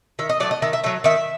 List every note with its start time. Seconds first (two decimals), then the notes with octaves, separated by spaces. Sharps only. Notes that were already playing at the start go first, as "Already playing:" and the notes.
0.19 D#3 E5
0.29 D#5
0.40 F#3 A3 D5
0.51 D#5
0.62 D#3 E5
0.73 E5
0.84 F#3 A3 E5
1.04 D#3 E5